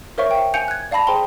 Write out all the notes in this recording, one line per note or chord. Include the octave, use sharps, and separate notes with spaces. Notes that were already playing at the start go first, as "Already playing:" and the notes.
A#4 C5 C#5 E5 F5 C#6
F5 G5
F5 G#5 G6 C#7 D7 F7
F#6 G#6
D5 F5 A5 B5 A#6
G#4 C5 G5 A#5 C6 G7